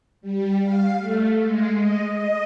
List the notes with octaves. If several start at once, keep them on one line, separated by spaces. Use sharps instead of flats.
G3
F5
A3
G#3
D#5
D#5